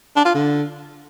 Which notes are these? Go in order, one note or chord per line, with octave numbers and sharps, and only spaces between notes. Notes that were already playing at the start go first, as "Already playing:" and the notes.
D4
F4
D3